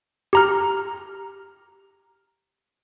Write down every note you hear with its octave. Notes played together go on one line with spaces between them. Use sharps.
G4 A#5 F6